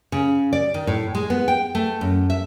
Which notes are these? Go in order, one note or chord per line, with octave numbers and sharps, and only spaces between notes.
C#3
D5
D#3
A2
G#3
B3
G5
A3
F#2
E5